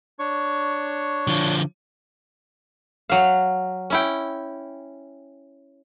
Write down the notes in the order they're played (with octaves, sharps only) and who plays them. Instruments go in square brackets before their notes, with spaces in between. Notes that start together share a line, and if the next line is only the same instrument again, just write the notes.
[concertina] D4 C#5 C#6
[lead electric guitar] D3 F3
[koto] F#3 F5
C#4 E4 G5